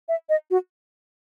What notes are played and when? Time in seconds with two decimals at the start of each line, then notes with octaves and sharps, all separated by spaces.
0.09 E5
0.29 D#5
0.51 F#4